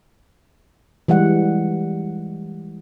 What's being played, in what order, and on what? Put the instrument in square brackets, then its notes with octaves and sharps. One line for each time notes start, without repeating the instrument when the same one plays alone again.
[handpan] E3 G3 G#3 F#5